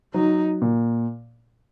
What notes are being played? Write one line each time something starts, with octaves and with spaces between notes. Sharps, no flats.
F#3 D#4
A#2